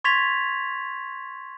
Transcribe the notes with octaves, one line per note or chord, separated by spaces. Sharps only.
C6 C#6 G#6 A6 B6 F7